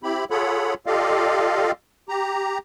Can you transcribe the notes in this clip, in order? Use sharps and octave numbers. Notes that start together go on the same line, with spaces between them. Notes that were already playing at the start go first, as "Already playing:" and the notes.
C4 E4 G4 B5
F4 G#4 A4 C#5 F#5 B5
F4 G4 A4 D5 D#5 F5
G4 A#5